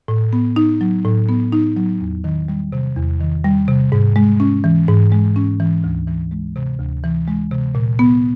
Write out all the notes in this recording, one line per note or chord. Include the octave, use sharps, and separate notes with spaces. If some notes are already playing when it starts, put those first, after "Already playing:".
A2
B3
D#4
F#3
A2
B3
D#4
F#3
E2
D#3
G3
C3
E2
D#3
G3
C3
G#2
G#3
C#4
E3
G#2
G#3
C#4
E3
D2
E3
G#3
C3
D2
E3
G#3
C3
A#2
B3